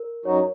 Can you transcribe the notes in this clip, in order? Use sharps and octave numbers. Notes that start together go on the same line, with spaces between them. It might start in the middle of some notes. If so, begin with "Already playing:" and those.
Already playing: A#4
F#2 F#3 D#4 F#4 C#5